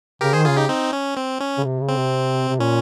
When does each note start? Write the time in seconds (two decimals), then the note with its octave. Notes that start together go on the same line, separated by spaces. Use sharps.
0.21 C#3 G4 A#4
0.33 D#3 G#4 C5
0.45 C#3 F4 G#4
0.57 D#4 G4
0.69 C4 D#4
0.93 C#4
1.17 C4
1.40 C#4
1.58 C#3
1.64 C3
1.81 C#3
1.89 C4
1.96 C3
2.48 C3
2.60 A#2 C#4